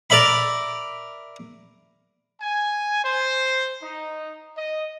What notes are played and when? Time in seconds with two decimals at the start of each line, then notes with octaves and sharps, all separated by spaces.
0.10 A#4 D5 E5 B5
2.41 G#5
3.04 C5
3.83 D#4
4.57 D#5